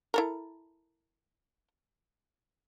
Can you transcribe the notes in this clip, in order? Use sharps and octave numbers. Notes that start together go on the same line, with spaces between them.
E4 A4 A#4